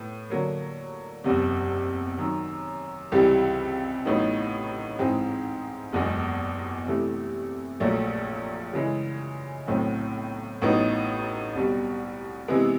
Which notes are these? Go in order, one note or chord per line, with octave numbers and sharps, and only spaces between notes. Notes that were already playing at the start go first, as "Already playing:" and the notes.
Already playing: A2 B3
D3 F#3 A#3
F#1 E2 C3
F#2 D#3 F#3
C#2 C3 E3 G3
A1 A2 F#3 B3 D#4
G#2 E3 G#3 C4
F#1 E2 B2 G#3
C3 E3 A3
A#1 A#2 F#3 A3
C#3 E3 G#3
B1 A2 F#3 A3 C4
A1 A2 F#3 B3 D#4
C2 B2 G3
C3 E3 G#3 B3